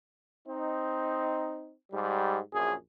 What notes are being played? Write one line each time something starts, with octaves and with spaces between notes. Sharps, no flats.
C4 D#4
G#2 G3
A#1 F#2 G#4